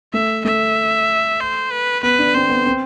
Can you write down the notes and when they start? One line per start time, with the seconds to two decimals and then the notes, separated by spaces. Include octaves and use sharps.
0.13 A3 E5
0.45 A3 E5
1.40 C5
1.71 B4
2.03 B3 B4
2.19 D4
2.35 C4 C5
2.50 B3
2.66 C4